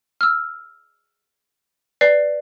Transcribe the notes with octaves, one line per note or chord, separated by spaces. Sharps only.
E6 F6
B4 D5 C7